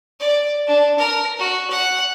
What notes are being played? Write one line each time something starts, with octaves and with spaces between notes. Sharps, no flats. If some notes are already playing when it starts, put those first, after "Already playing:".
D5
D4
A#4
F#4
F#5